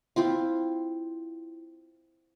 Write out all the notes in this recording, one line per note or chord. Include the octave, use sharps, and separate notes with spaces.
C4 E4 F4